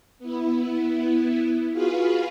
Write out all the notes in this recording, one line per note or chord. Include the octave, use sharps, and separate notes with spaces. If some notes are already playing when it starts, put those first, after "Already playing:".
B3 E4
F4 F#4 G#4 B4 F5